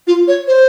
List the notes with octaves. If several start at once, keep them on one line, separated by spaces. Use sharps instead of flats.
F4
C#5
C5